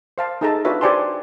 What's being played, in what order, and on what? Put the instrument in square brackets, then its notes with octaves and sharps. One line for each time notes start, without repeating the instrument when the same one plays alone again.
[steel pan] C5 F5 A5
D#4 G#4 A4 E5 A5 A#5
D4 F4 F#4 B4 C#5 E5
G4 C5 D5 G#5 A5 C6